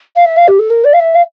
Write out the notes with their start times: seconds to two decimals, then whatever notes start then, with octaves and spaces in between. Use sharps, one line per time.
0.16 F5
0.25 E5
0.37 F5
0.48 G4
0.59 A4
0.70 A#4
0.84 D5
0.93 F5
1.00 E5
1.14 F5